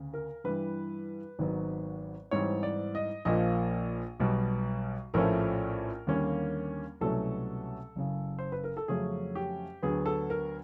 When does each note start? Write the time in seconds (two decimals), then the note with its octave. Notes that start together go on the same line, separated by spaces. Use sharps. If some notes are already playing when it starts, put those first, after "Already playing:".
Already playing: D2 C#3
0.14 A#4
0.44 G2 E3 G3 B4
1.39 G#1 G#2 D#3 F#3 B3
2.31 G#2 E3 G3 C4 C#5
2.63 D5
2.95 D#5
3.25 A#1 A#2 F3 A#3 D#5
4.20 B1 B2 G3
5.14 A#1 A2 F3 A3 C#4 A#4
6.07 D#2 D3 G3 A#3 C#4
7.01 C2 B2 F#3 A3 C#4 A4
7.96 F#1 F#2 C#3
8.39 C5
8.52 B4
8.64 A#4
8.77 A4
8.88 F2 C#3 F#3 A3 C#4 G#4
9.35 G4
9.82 D2 D3 F#3 B3 G#4
10.06 A4
10.30 A#4